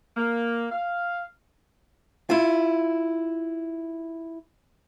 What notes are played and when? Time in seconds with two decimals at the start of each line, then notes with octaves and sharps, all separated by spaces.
0.17 A#3
0.72 F5
2.30 E4 F4